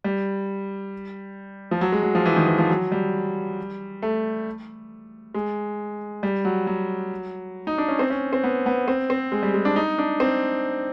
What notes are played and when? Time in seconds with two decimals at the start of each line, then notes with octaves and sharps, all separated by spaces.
0.04 G3
1.71 F3
1.81 F#3
1.92 G#3
2.03 F#3
2.15 F3
2.26 E3
2.36 D#3
2.47 E3
2.58 F3
2.70 F#3
2.92 G3
4.02 A3
5.35 G#3
6.23 G3
6.45 F#3
6.67 F#3
7.67 D#4
7.78 D4
7.88 C#4
7.99 C4
8.10 C#4
8.33 C4
8.44 B3
8.66 B3
8.88 C4
9.10 C4
9.32 G#3
9.43 G3
9.54 G#3
9.65 D4
9.76 D#4
9.98 D4
10.20 C4